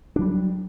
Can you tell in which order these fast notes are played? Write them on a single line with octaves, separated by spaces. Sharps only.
D4 F#3 G3